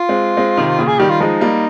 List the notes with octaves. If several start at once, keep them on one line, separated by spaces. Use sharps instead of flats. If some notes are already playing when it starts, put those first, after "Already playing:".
Already playing: F4
G#3 C4
G#3 C4
C3 D#3
A#2 C#3
G#4
D#3 G3 G4
F4
F3 G#3 D#4
G3 A#3